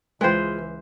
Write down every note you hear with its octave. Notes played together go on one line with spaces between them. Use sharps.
C#2 E3 G#3 F4 B4 C5